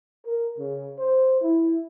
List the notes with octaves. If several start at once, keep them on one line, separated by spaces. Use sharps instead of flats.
A#4
C#3
C5
E4